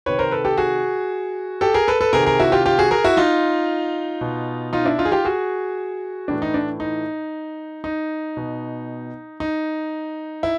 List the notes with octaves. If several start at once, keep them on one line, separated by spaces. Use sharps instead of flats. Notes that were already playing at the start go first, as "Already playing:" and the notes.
C3 D#3 B4 C#5
A#4 C5
A4 B4
G4 A4
F#4 G#4
G4 A4
G#4 A#4
A4 B4
A4 B4
C3 D#3 G#4 A#4
G#4 A#4
E4 F#4
F4 G4
F4 G4
F#4 G#4
G#4 A#4
E4 F#4
D#4 F4
B2
D#4 F4
D4 E4
D#4 F4
G#4
F4 G4
F#4 G#4
A2 E3 D4
D#4
D4
D#4
D#4
B2
D#4
E4